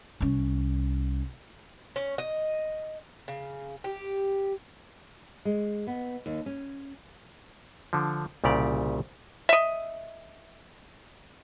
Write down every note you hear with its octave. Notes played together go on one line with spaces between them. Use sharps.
C2 C#4
C#4
D#5
C#3
G4
G#3
B3
D#2
C#4
D3 F3
C2 A#2 C#3 G4 D5
D#5 E5